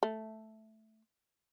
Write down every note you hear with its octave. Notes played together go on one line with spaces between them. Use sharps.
A3